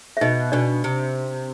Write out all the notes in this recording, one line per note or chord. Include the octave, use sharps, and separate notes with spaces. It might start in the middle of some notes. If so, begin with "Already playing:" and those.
E5
B2 D#4 D#5
B2 D4 D5
C3